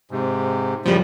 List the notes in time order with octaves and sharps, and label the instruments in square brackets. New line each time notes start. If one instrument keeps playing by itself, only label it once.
[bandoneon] G#2 C3
[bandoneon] F#2 A2 C#3 [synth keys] F3 G3